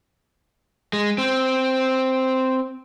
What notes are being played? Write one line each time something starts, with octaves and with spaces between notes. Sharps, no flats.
G#3
C4